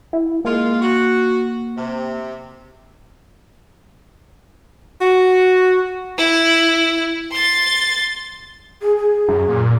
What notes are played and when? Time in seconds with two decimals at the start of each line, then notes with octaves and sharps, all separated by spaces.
0.13 E4
0.45 G#3 A#3 F4
0.81 F#4
1.77 C3
5.01 F#4
6.17 E4
7.32 C6 A6
8.82 G#4
8.97 G#4
9.29 F#2
9.49 A#2